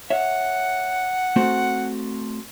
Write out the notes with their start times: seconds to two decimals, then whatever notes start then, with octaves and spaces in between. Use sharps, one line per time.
0.10 C#5 E5 F#5
1.36 A3 C4 F#4